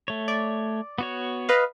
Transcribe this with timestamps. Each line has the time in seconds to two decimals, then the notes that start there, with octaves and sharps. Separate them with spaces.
0.08 A3 C#5
0.28 D5
0.98 B3 F#4 C#5
1.49 B4 D#5 F5